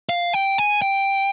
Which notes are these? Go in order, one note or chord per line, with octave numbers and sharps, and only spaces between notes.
F5
G5
G#5
G5